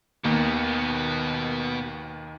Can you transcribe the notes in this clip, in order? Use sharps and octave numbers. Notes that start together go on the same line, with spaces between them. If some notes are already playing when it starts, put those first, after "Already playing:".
D#2 B2 D#3 A#3 B3